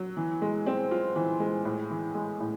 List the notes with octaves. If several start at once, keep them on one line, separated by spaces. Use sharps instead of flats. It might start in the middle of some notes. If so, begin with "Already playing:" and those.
Already playing: F#3
E3
G#3
C4
F4
E3
G#3
A2
E3
G#3
A2